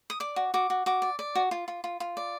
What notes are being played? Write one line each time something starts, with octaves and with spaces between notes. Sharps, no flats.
D#6
D5 D6
F#4
F#4 D6
F#4
F#4 D6
D5
D5
F#4
F4
F4
F4
F4
D5